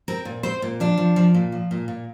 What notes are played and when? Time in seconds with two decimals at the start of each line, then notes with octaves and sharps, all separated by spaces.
0.08 C4 A#4
0.25 A#2
0.43 C4 C5
0.62 A#2
0.80 F3 D4
0.98 F3
1.16 F3
1.34 A#2
1.52 F3
1.71 A#2
1.88 A#2